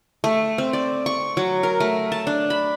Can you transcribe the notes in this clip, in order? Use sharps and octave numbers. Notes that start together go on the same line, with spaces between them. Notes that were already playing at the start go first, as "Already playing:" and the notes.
A3
C4
D5
C#6
F#3
A#4
A3
A5
D4
B5